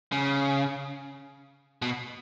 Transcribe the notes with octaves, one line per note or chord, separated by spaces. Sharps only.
C#3
B2